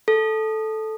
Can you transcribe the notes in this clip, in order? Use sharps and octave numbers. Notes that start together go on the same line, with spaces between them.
A4